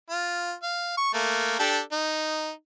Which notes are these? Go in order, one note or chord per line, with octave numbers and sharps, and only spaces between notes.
F4
F5
C#6
A3 A#3
D4 G4 A4
D#4